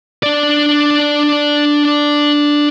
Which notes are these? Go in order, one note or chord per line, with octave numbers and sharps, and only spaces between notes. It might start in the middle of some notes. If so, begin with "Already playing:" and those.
D4 D5